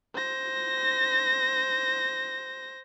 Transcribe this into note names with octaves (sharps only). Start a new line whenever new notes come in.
C5 A#6